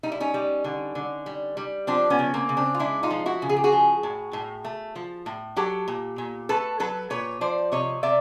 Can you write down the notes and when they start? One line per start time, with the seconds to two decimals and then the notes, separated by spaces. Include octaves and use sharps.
0.03 G3 D#4
0.12 E4
0.20 C#4 D#4
0.34 G3
0.64 D3
0.95 D3
1.26 G3
1.57 G3
1.87 F3 C4 D4
2.10 B3 C#4
2.19 C#3
2.34 A#3 C4
2.49 C#3
2.57 C4 D4
2.74 F4
2.79 G#3 D4 E4
3.03 D#4 F4
3.11 F3
3.26 E4 F#4
3.42 C#3
3.49 G#4
3.57 G4
3.64 F#4 G#4
3.72 F3
4.03 A2
4.33 A2
4.65 A3
4.95 F3
5.26 A2
5.56 F#3 G4 A4
5.88 A#2
6.18 A#2
6.49 A3 A4 B4
6.80 F#3 A4 B4
7.10 A#2 B4 C#5
7.41 F3 C5 D5
7.72 C3 C#5 D#5
8.03 C3 D5 E5